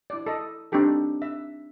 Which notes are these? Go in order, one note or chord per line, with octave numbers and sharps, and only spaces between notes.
E4 D5
A4 D#5
C4 D4 D#4 G4 A4
E5